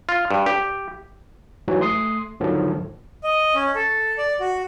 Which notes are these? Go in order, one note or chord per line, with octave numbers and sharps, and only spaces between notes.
F4
G2
G4
G#2 E3 F#3 G3 F#4
A3 C6 D#6 C7
D#2 G#2 D3 D#3 F3 F#3
D#5
C#4
A4
D5
F#4